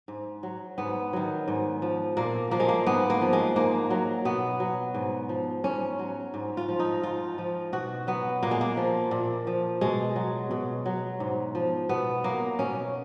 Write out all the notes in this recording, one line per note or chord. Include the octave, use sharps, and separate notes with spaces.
G#2
F#3
G#2 B3
D#3 F#3
G#2
F3
A#2 A#3
F3 A#3
G#3
A#3
G#2 B3
A#3
F3
G#3
G#2 A#3
F#3
B2 B3
F#3
G#2
F3
G#2 C#4
F#3
G#2
F4
F3
D#4
G#2 F4
F3
B2 F#4
F#3 B3
A#2 A#3
G#3
A#3
F3
A#2
F3
B2 G#3
F#3
B2
F#3
G#2
F3
B2 B3
F#3 A#3
B2 C#4